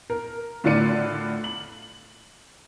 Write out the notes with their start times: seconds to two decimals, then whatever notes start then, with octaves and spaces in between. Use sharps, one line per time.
0.10 A#4
0.64 A2 D3 F4 D5 C#7 D#7
1.44 F#7